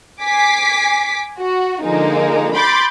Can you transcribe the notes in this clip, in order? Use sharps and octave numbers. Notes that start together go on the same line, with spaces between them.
G#5 D6 B6 C7
F#4
D3 F3 G#3 A#3 D#4
B5 C6 D6 G6 A6